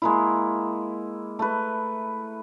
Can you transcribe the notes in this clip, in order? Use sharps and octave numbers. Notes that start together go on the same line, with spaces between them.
G#3 A#3 E4
A3 B4